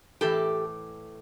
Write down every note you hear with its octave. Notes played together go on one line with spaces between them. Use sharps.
A2 E3 G4 A4